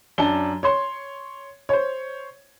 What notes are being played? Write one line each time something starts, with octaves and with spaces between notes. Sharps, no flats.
F#2 D4 A5 G7
C#5 C6
C5 C#5